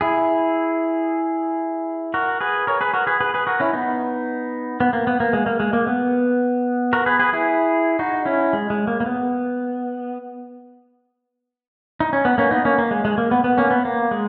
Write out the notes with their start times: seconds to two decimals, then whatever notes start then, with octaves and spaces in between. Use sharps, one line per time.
0.01 E4 G#4
2.14 F#4 A#4
2.41 G#4 B4
2.67 A#4 C#5
2.81 G#4 B4
2.94 F#4 A#4
3.07 G#4 B4
3.21 G#4 B4
3.34 G#4 B4
3.47 F#4 A#4
3.60 C#4 E4
3.73 B3 D#4
4.80 B3
4.93 A#3
5.07 B3
5.20 A#3
5.33 G#3
5.46 A#3
5.60 G#3
5.73 A#3
5.87 B3
6.93 F#4 A#4
7.06 G#4 B4
7.19 G#4 B4
7.33 E4 G#4
7.99 D#4 F#4
8.25 C#4 E4
8.53 G#3
8.70 G#3
8.87 A#3
9.00 A#3
9.06 B3
12.00 D#4
12.13 C#4
12.25 B3
12.38 A#3 C#4
12.51 B3 D#4
12.65 A#3 C#4
12.78 A#3
12.91 G#3
13.05 G#3
13.18 A#3
13.31 B3
13.44 B3
13.58 A#3 C#4
13.71 B3
13.85 A#3
14.11 G#3